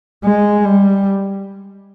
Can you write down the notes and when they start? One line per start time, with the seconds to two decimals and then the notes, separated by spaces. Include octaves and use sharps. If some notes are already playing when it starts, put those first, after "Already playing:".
0.25 G#3
0.65 G3